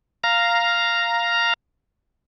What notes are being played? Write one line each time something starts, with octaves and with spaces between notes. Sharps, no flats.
F5 A#5